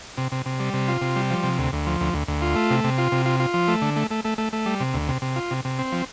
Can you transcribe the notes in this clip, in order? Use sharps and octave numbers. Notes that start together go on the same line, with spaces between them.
C3
C3
C3
G3
C3
F4
C3
G3
F3
C3
D2
D2
F3
D2
D2
D2
F4
A3
C3
C3
F4
C3
F4
F4
F3
A3
D3
A3
A3
A3
A3
A3
G3
C3
D2
C3
C3
F4
C3
C3
C4
F3